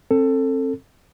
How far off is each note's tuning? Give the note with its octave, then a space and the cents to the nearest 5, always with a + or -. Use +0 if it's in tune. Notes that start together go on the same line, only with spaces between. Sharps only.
C4 +30 A4 +15